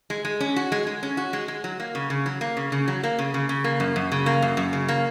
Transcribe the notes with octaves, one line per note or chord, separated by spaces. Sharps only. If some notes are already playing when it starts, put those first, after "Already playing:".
G#3
G#3
C#4
F#4
G#3
G#3
C#4
F#4
G#3
G#3
F#3
A#3
C#3
C#3
F#3
A#3
C#3
C#3
F#3
A#3
C#3
C#3
C#3
A#3
F#2
F#2
C#3
A#3
F#2
F#2
C#3
A#3